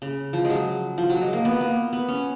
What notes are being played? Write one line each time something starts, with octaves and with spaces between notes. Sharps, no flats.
C#3
F3
F#3 G#3
F3
F#3
G#3
A#3
B3
A#3
B3
C#4